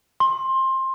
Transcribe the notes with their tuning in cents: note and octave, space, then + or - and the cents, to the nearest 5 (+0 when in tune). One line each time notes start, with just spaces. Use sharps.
C6 +20